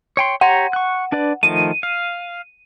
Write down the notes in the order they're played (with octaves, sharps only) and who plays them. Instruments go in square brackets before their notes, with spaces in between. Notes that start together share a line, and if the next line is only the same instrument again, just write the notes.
[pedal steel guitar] C#5 G5 C6
[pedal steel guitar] G4 C#5 A#5 [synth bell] F#5
[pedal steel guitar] C#6 F#6
D4 B4 D5
[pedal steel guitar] D#3 F3 A3 [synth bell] D#7
[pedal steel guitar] F5